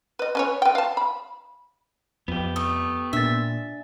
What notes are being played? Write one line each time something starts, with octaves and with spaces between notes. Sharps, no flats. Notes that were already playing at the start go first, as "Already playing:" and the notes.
B4 D#5
C#4 B4 C#5
B4 G5
F5 A5
B5
F2 B3 G4
A3 D#6
A#2 D4 E5 A6